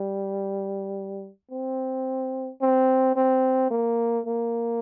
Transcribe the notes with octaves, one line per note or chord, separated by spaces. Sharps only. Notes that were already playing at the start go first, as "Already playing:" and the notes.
Already playing: G3
C4
C4
C4
A#3
A#3